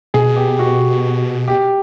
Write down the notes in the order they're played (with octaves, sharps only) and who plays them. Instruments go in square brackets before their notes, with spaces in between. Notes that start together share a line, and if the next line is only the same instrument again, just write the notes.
[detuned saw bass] B2 [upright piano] G#4
[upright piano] G4
F#4
G4